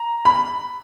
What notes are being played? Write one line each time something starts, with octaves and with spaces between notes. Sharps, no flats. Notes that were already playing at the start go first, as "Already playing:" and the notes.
Already playing: A#5
B5